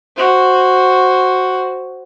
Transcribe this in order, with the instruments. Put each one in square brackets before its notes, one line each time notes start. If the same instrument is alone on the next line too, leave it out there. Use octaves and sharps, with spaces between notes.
[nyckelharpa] F#4 C5